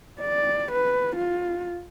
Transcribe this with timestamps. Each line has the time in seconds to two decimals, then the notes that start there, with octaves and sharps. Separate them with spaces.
0.21 D5
0.72 B4
1.16 F4